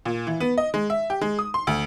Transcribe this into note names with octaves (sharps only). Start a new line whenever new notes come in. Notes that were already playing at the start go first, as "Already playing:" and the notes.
A#2
E3
B3
D#5
G#3
E5
G4
G#3
D#6
C6
D2